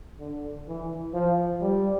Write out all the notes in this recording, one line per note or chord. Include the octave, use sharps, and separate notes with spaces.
D3
E3
F3
G3